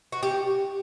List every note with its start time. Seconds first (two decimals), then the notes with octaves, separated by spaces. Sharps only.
0.12 F#4
0.23 G4